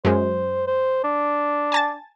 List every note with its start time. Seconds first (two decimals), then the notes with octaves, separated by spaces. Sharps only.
0.05 F#2 G#3 C5
0.67 C5
1.04 D4
1.72 G#5 A5 A6